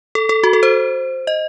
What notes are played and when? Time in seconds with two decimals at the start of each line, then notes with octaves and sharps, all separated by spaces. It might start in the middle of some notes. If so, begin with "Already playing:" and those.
0.15 A4
0.29 A4
0.43 F#4
0.53 A4
0.63 C5
1.27 D#5